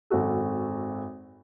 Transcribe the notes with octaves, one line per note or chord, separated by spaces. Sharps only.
G#1 F#2 F#4 A4